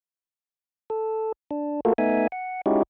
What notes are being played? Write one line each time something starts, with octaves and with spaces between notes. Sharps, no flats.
A4
D4
A3 A#3 F4 F#4 A4 A#4
A3 B3 D#4 E5 G#5
F#5
G#3 C#4 D#4 E4 F#4 G4